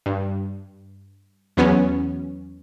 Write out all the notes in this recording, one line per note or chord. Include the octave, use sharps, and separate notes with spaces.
G2
E2 F#3 B3 C#4